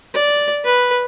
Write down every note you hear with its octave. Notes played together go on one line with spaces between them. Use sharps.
D5
B4